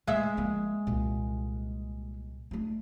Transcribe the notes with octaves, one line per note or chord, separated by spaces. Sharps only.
E3 G#3 E5
F3 A#3
C2 A#2
A3 D4